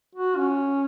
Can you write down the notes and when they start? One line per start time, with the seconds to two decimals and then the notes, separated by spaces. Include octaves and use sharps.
0.15 F#4
0.37 C#4